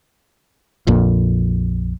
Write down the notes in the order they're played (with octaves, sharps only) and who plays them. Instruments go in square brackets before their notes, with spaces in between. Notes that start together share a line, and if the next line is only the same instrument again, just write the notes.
[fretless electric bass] A#1 F2 A#2